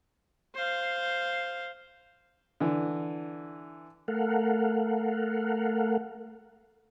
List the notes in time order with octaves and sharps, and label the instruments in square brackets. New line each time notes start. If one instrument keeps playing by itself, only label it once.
[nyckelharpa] C5 F5
[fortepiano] D3 E3
[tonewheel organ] A3 A4 A#4 F5 F#5